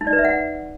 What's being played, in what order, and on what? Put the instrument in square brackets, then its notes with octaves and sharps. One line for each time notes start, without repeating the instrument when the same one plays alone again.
[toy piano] D#4
D5
B4
E5
F#5